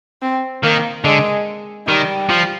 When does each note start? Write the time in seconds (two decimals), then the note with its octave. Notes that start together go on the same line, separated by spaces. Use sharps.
0.22 C4
0.63 D#3 A#3
1.05 D3 G#3
1.87 D#3 G3
2.29 F3